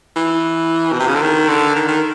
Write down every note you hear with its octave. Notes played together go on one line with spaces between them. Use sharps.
E3
B2
C3
C#3
D3
D#3
D3
D#3
D#3